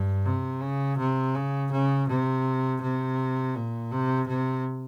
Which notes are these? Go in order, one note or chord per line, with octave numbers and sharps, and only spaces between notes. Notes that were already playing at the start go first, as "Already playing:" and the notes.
Already playing: G2
C3
C#3
C3
C#3
C#3
C3
C3
A#2
C3
C3